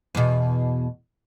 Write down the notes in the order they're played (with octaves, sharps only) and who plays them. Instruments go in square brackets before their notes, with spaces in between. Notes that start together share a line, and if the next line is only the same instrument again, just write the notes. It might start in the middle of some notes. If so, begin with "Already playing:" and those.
[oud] E2 B2